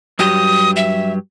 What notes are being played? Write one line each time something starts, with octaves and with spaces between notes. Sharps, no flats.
G2 F#3 G4 D#6
E5